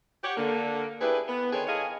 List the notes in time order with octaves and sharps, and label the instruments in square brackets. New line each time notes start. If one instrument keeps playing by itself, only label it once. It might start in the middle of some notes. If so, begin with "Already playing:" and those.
[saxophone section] G4 C#5 F#5
D3 A#3
D4 E4 G4 G#4 B4
B3
D3 D#3 C4 G#4 B4 C#5
E4 G#4 A4 C#5 D#5 F5